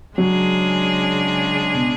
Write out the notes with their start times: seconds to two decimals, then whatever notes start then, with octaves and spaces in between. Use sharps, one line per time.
0.17 C#3 F#3 G#3 D4 G#4
1.74 B2